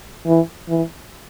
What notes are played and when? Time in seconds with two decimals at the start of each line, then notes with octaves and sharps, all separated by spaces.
0.26 E3
0.69 E3